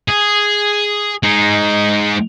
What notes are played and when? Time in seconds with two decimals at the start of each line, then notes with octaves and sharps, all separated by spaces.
0.08 G#4
1.23 G#3 D#4